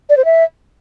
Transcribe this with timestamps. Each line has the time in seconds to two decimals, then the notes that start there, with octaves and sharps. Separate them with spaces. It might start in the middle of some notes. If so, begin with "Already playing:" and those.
0.09 D5
0.17 C5
0.25 E5